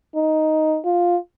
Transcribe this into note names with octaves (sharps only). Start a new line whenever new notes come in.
D#4
F4